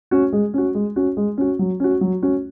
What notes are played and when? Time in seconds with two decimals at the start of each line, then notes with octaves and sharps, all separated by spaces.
0.11 C#4 F#4
0.33 G#3
0.54 C#4 F#4
0.75 G#3
0.96 C#4 F#4
1.17 G#3
1.38 C#4 F#4
1.59 F#3
1.80 C#4 F#4
2.01 F#3
2.22 C#4 F#4